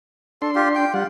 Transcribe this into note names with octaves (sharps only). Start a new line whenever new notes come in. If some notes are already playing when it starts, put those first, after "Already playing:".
D4 A4 C6
F4 G4
G5
G3 F4 F#5